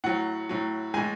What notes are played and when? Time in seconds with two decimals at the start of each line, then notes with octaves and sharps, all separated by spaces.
0.04 A2 F#3 F#5
0.49 A2 F#3
0.94 A2 E3 G#3 G#5